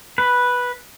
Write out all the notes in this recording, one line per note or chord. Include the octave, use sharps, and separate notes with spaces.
B4